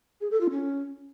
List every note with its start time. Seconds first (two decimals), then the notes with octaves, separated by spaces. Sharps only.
0.21 G#4
0.31 A4
0.41 F4
0.51 C#4